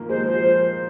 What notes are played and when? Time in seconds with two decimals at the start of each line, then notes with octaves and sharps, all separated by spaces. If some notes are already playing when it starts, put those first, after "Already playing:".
Already playing: D#3 F3 A#3
0.09 G#3 C5
0.27 F3 C5